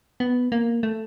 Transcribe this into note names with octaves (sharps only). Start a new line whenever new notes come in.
B3
A#3
A3